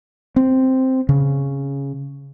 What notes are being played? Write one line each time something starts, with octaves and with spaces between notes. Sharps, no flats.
C4
C#3